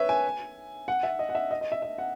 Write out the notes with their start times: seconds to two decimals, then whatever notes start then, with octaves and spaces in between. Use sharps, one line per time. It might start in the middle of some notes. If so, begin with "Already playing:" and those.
Already playing: B4 C#5 E5
0.09 G#5
0.88 F#5
1.03 E5
1.19 D#5
1.29 F#5
1.35 E5
1.51 D#5
1.61 D#5
1.72 E5
1.82 E5
1.98 F#5